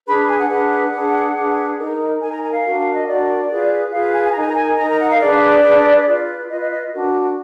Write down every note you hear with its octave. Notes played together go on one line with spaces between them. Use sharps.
D4 G#4 B4 B5
G#5
F#5
D4 G#4 B4 F#5
D4 G#4 B4
D4 G#4 B4
D#4 A#4
D#4 A#4 G#5
A#5
G#5
F5
D4 F#4 A#4
F5
D#5
D4 F#4 A#4 D5
F4 G#4 B4
F4 G#4 B4 F5
G#5
G#5
A#5
D#4 A#4 G#5
A#5
G#5
D#4 A#4 A#5
A#5
F#5
F5
D4 G#4 B4 D5
D4 G#4 B4
F4 B4
F4 B4 D#5
D#5
D#5
D4 F#4 A#4